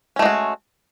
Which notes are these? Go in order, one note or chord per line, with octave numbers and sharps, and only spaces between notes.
G#3 A3 C#4 F#4